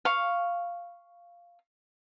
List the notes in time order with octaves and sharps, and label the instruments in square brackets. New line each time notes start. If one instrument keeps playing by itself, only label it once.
[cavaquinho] F5 C#6